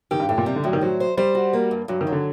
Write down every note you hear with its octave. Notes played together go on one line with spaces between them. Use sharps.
D#3 G4
G2
A2 G4
A#2
C3 G3
D3
A2 F#3
D#3
F#3 C5
C5
G3 C5
F#4
A#3
G2
G2 F#3
D#3
F#3
D3